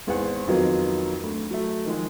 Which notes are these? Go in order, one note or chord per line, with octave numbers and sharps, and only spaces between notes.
G#1 E2 B4 C5 F#5
F2 D#3 F#3 A#3 B3 F4
D2
F#3 A3
D#3 F3 G#3